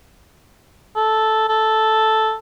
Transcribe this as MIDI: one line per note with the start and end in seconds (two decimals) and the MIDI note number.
0.96 1.46 69
1.48 2.34 69